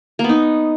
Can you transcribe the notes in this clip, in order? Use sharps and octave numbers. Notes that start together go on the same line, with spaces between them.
A#3
B3
D#4